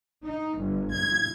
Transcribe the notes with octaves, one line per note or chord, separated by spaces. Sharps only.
D#4
G1
G#6